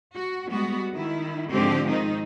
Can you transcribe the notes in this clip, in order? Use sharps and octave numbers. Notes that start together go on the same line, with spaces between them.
F#4
G3 G#3 B3 F#4
D#3 E4
G#2 D3 F3 G#3 C4 G4
D#3 C4 D#4